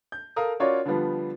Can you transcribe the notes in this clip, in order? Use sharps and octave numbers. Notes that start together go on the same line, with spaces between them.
G6
A4 A#4 F5 D#6
C#4 F4 F#4 A#4 C#5 D5
D3 F3 G3 B3